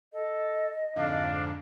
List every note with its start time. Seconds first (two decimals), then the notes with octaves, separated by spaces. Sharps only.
0.13 A4 D#5
0.96 F2 G#2 D3 D4 F5